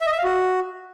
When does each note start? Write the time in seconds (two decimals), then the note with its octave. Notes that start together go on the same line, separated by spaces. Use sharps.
0.01 E5
0.06 D#5
0.12 E5
0.18 F5
0.24 F#4